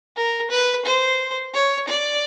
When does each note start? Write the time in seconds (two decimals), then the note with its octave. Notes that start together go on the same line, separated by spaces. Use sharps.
0.17 A#4
0.51 B4
0.85 C5
1.54 C#5
1.88 D5